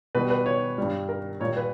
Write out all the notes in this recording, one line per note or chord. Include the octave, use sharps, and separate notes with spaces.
B2 G3 B4
B4
C#5
G2 G3
A#4
A#2 G3 C#5
B4